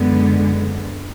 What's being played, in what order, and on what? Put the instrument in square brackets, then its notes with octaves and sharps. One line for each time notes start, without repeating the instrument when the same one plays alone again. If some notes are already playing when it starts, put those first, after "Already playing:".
Already playing: [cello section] F#2 D3 G#3 B3